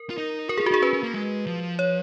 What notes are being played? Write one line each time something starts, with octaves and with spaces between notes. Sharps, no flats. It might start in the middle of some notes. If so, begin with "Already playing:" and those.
Already playing: A#4
F4
D#4
F#4 A#4
G#4
F4
F#4
D#4 G#4
C#4 B4
C#4
A#3
G#3
F3
C#5